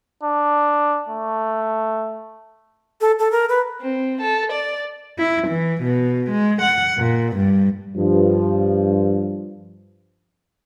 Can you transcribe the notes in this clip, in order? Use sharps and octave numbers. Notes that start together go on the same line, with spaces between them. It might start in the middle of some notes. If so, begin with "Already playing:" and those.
D4
A3
A4
A4
A#4
B4
C4
A4
D5
E4
E3
B2
G#3
F#5
A#2
G2
G2 F3